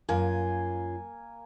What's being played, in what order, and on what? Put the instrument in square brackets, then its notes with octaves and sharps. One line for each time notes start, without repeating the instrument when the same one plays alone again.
[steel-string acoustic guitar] F#2 F4 [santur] A#3 G#5